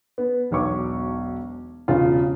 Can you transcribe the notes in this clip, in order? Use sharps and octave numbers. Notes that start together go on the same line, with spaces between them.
B3
E1 B1 C#5 C#6 D6
E1 C#3 F4